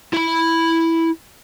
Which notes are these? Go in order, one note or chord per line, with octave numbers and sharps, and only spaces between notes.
E4 B5